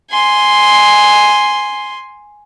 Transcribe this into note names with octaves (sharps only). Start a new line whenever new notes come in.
G#5 C6